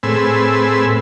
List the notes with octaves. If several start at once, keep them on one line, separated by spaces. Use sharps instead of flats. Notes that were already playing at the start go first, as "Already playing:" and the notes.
A2 C4 G#4 B4 E6